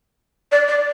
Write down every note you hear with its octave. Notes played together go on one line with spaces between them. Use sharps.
D5
D5